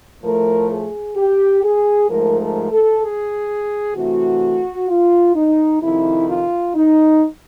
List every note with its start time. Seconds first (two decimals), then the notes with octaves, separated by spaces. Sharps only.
0.23 A2 F3 A3 A#4
0.70 G#4
1.17 G4
1.63 G#4
2.09 G#2 F3 A3 A#4
2.41 A#4
2.72 A4
3.03 G#4
3.95 C3 E3 A3 F#4
4.89 F4
5.35 D#4
5.81 F2 C3 D#3 E4
6.28 F4
6.75 D#4